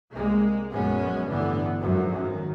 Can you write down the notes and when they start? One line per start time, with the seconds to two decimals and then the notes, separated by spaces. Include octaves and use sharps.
0.13 C2 G#3 A#3
0.73 A#1 F#2 G#3 B3 C#4
1.28 G1 A2 D3 E3 B3
1.79 G#1 F#2 D3 F3 F#3
2.18 D#3